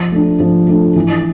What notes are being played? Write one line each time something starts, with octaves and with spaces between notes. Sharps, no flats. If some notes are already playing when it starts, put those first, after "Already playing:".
Already playing: F3
A3 D4
F3
A3 D4
E3